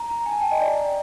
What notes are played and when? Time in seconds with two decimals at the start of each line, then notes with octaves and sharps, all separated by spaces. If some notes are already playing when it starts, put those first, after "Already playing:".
Already playing: A#5
0.10 A#5
0.26 G#5
0.31 A5
0.41 G5
0.51 D#5
0.61 D5